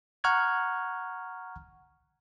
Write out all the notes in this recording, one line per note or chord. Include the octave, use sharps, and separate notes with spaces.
F#5 A#5 C#6 F6 F#6 G#6